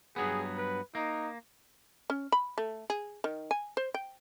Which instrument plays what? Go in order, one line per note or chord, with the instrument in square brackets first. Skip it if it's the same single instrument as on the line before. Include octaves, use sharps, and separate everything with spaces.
[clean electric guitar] G2 F#3 B3 [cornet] G#4
[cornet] B4
[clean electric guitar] A#3 [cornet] D#4
[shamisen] C#4
B5
A3
G#4
D#3
G#5
C5
G5